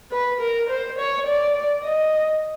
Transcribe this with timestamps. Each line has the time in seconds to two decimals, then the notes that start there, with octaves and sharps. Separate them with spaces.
0.12 B4
0.41 A#4
0.70 C5
0.99 C#5
1.27 D5
1.84 D#5